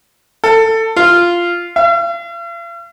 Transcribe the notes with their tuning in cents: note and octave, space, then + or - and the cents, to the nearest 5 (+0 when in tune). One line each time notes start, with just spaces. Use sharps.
A4 +20
F4 -5
F5 -45